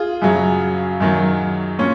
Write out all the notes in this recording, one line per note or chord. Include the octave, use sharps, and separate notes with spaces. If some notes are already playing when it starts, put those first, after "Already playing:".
Already playing: F4 G#4
F#2 C#3 F#3
F#2 D#3 F#3
A#2 C#4